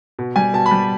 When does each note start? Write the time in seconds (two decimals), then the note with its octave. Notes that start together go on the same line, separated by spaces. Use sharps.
0.19 B2
0.36 G3 G#5
0.54 B2 A5
0.66 B5
0.71 G3